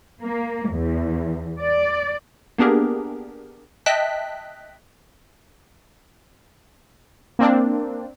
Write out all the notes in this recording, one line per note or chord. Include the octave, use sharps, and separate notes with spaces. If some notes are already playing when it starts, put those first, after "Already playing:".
A#3
E2
D5
A#3 B3 D4 G4 G#4 A#4
D#5 E5 G5 A5 F#6 B6
A#3 C4 D4